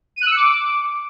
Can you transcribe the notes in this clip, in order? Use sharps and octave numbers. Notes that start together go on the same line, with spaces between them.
D#7
F#6
E6
C#7
D6